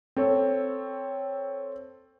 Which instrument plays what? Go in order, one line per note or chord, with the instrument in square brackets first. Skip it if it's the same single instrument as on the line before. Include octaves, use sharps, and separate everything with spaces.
[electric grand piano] C4 A4 C#5